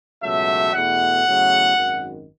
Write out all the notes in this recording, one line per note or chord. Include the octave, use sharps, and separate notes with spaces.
C#2 B2 F#3 A3 E5
E2 B2 A3 F#5
E2 C#3 F#3 A3
G#1 F#2 D#3